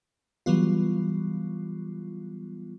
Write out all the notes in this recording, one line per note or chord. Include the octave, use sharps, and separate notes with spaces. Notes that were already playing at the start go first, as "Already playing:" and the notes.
E3 F#3 G3 B3 F4